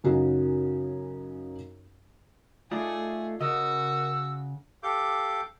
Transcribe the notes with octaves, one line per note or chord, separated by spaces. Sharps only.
F#2 C#3 C#4 D#4 F#4
A3 D#4 F4 G#4 D5
C#3 F#4 A#4 D#5 E6
G4 A4 F5 D6 G6